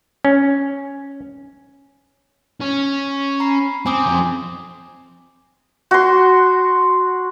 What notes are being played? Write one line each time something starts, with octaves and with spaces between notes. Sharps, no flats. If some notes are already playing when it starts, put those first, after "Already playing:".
C#4
C#4
A#5 B5 C7
C4 G#5 D6 D#6
F3 C4
F#4 C6